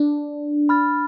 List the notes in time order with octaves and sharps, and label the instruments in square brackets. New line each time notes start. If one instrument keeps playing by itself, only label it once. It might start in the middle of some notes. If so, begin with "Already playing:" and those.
Already playing: [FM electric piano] D4
[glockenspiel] B5 F6 A6